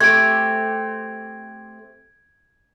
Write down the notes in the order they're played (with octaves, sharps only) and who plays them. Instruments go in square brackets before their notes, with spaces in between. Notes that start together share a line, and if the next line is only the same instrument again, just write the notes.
[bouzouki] A3 C4 G4 [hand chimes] G#6 D7